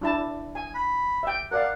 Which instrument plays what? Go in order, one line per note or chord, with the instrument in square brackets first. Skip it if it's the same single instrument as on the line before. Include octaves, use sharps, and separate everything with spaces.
[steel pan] D4 E4 A5
G#5
[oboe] B5
[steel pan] E5 G5
[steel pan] A#4 D5 F5 [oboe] F#5